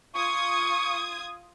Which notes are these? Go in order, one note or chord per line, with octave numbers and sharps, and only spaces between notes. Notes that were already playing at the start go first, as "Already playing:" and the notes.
F4 C#6 D#6 G#6